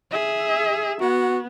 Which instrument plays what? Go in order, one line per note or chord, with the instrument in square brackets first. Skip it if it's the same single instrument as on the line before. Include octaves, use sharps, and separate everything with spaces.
[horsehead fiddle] G#4 E5
[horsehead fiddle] B3 [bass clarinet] F#4